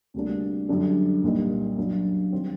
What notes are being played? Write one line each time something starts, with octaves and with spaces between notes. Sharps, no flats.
D2 C3 G3 A#3 D4
F#2 D3 G3 D4 A4
C2 A#2 G3 A#3 D#4
F#2 F#3 A#3 D4
D#3 G3 C4